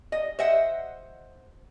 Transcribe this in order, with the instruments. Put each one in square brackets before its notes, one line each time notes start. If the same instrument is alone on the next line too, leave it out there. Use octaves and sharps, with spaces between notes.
[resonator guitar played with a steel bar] D#5
C5 D#5 E5 F#5